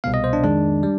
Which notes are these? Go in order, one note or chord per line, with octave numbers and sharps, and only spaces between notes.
C2 B2 B3 F5
D#5
C5
D4
F2 D#3 G#3 D4
G3